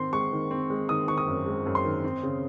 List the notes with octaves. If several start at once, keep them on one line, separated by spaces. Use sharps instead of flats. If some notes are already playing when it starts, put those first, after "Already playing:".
Already playing: D#3 C4 C6
G#3 C#6
D#3
C4
G#3
D#3 D#6
D#3 C#6
D#6
F#2
G#3
F#2
C6
D#3
C4
C#3